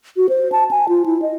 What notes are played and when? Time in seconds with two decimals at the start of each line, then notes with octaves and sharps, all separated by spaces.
0.17 F#4
0.29 C5
0.52 A5
0.71 G#5
0.89 F4
1.06 E4
1.22 D#5